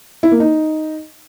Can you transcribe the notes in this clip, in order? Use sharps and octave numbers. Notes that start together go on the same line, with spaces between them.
E4
A#3
D#4